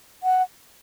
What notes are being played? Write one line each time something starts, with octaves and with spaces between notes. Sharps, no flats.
F#5